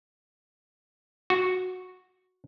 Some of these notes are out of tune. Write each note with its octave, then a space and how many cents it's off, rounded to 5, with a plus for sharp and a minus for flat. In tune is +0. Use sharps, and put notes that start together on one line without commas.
F#4 -10